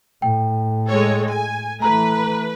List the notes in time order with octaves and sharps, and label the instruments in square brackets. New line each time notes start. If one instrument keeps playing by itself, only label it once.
[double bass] A2 [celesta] G5
[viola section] G#3 A4 C#5
G#5
[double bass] E3 A3 [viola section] B4 [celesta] A#5